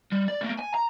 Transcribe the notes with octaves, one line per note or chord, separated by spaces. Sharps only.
G3
D5
A3 A#3
G#5
A#5